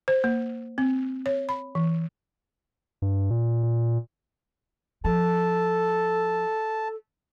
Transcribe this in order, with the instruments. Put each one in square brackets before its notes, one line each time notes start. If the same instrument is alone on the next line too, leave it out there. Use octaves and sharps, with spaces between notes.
[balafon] C5
A#3
C4
C#5
B5
E3
[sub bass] G2
A#2
A#2
[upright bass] F3 [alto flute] A4 [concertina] A5